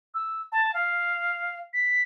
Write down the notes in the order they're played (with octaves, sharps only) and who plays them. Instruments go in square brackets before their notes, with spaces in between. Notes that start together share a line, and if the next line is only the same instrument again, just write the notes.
[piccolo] E6
A5
F5
B6